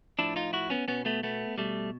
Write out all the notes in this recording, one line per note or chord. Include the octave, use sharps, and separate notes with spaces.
A2 F3 D4 E4
D#4 F4
E4 F#4
B3 C#4
B2 B3 C#4
A3 B3
A3 B3
B2 G3 A3